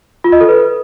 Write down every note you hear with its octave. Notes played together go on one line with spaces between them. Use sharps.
F4
D#5
A4
B4